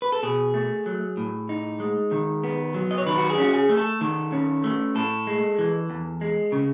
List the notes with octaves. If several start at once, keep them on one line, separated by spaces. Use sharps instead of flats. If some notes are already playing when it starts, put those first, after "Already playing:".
B4
A4
B2 G#4
A3
F#3
A2
D#4
G#3
D#3
B3
F#3
D#5
C#5
D#3 B4
F#4
G#4
C#4 F#4
G#4
A3
A4
D#3
C#4
A3
A2 A4
G#3
E3
E2
G#3
C#3